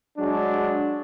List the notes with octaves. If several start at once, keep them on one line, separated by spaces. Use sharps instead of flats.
F#3 G#3 D4